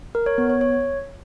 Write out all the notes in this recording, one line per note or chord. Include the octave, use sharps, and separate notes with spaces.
A#4
C#5
B3
C#5
C#5